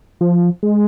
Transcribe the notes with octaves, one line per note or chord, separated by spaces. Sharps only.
F3
G#3